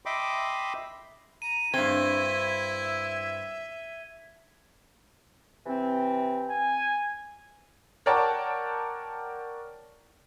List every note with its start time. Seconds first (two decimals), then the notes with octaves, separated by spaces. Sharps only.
0.06 D#5 E5 G5 B5 C6 D6
1.42 A#5 D#7
1.74 G2 C4 E4 E5 G#6 G7
5.66 C3 E3 C4
6.51 G#5
8.06 A#4 C#5 D5 F#5 G5 A5